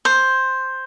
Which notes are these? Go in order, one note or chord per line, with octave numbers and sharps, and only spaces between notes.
C5